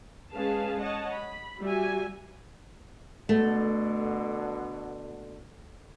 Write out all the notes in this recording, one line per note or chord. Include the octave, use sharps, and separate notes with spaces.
G#3 C#4 G#4 B4 F5 A5
C#5 D#5 F#5 A5
B5
G3 F#4 E5 G#5
B2 D3 A3